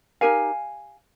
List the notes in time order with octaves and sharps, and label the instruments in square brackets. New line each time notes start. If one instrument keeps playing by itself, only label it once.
[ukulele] D#4 G4 A#4 F5 G#5